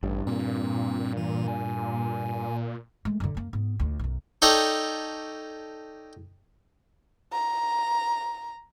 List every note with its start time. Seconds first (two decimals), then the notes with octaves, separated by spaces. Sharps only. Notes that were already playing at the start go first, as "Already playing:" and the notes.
0.03 A1 G2
0.27 A#2 C4
1.17 E3
1.48 G#5
3.05 G#3 A3
3.20 F#2 D3
3.35 F#2 A#3
3.53 G#2 B3
3.80 D2 F4
3.99 B1 F#2
4.42 D#4 A4 C#5 D5 G5 D#6
7.32 A#5